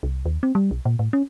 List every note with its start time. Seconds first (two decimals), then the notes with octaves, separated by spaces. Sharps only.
0.03 C2
0.26 D#2
0.43 C4
0.55 G3
0.71 B1
0.85 A#2
0.99 A2
1.13 C#4